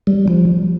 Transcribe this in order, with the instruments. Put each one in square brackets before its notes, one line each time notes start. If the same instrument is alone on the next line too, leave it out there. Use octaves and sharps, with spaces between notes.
[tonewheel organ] G3
F3